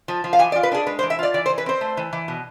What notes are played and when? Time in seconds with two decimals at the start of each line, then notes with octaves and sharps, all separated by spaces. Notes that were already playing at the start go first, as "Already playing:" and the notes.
0.08 F3
0.24 F3
0.33 F5
0.39 E3 G#5
0.52 D5
0.56 F4
0.63 B4
0.72 D4 G#4
0.87 G#3 B4
0.99 C5
1.03 E3
1.10 E5
1.19 F4 D5
1.34 E3 D5
1.46 C5
1.49 E3
1.58 B4
1.66 C4 C5
1.81 A3
1.97 E3
2.13 E3
2.28 B2